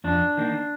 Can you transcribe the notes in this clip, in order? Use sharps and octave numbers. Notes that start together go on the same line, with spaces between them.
F2 D4
D#3 A#3